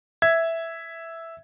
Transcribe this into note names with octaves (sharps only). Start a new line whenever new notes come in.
E5 G#6